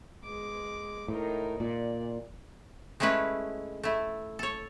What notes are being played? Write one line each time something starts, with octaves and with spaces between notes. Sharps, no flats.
G#3 D6
A2 D#4 A#4
A#2 D5
G#3 A3 C#4 E4 B4
A3 E4
A4 C#5